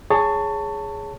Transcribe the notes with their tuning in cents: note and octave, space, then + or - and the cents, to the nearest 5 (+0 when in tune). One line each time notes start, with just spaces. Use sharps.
G#4 +0 C#5 +10 A5 +20